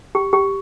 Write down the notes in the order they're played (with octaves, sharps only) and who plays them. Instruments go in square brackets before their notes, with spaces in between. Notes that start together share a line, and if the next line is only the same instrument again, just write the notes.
[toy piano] G4
G4